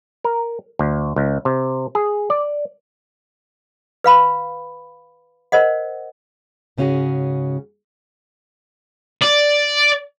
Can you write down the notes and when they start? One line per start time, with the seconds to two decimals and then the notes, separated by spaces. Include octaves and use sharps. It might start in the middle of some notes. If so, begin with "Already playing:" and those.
0.24 A#4
0.79 D2
1.16 C#2
1.45 C3
1.95 G#4
2.30 D5
4.04 B4 F5 B5
5.52 A#4 C5 D#5 F#5
6.78 G#2 C#3 C#4 F4 F#4 G#4
9.22 D5